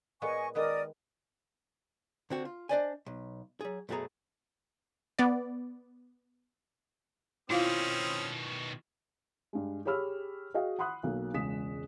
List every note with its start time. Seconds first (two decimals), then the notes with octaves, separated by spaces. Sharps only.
0.22 A#2 G#3 B3 D#5 G#5 C#6
0.55 D#3 G#3 B3 A#4 D5 D#6
2.30 D3 C4 F#4
2.45 F4
2.69 D4 F#4 C5 D5 D#5 G#5
3.06 B1
3.61 F#3 G#4
3.89 F#2 B2 A3 F#4 G#4 A#5
5.19 B3 D5
7.50 B2 D#3 C4 C#4 E4 F4 F5 D#6
9.53 G2 G#3
9.85 G4 G#4 C#5 B5 E6 F6
10.54 F#4 G#4 D#5 F5 G5
10.79 F#5 B5 C6 D#6 F#6
11.03 B1 F#3 A#3
11.34 E1 C#2 G#3 D#6 B6 E7